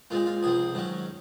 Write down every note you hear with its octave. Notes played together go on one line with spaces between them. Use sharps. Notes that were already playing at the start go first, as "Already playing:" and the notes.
A#2 G#3 C4 F4
F4
C#2 C3 F3 C4 G#4
G#2 D#3 F#3 C#4